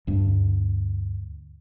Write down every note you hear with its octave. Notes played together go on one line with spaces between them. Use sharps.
D2 G2